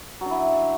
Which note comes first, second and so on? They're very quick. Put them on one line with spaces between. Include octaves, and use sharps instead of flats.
F#3 D4 E4